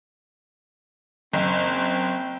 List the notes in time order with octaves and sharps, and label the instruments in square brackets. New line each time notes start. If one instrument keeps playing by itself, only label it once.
[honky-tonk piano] F#1 [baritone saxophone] C4